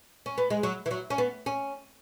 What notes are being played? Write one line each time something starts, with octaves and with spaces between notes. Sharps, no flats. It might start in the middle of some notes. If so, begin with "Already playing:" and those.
C#4
B3
G#3
F#3
E3
F#3
C#4
B3
C#4